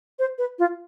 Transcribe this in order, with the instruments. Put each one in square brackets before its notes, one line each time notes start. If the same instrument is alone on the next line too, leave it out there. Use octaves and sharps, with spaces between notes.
[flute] C5
B4
F4